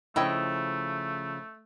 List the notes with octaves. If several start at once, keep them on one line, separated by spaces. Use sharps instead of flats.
C#3 F3 A3 E4 D#5 G5